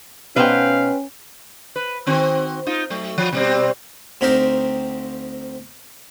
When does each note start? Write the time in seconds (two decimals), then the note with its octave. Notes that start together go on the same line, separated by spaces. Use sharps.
0.36 B2 B3 C#4 D#4 B4 C5 F5 G5
1.76 B4
2.07 D#3 C4 F#4
2.67 D#4 F4
2.90 F#3 A3
3.18 F3
3.33 B2 G3 C4
4.21 D2 C4 D#4 G4 A#4 C5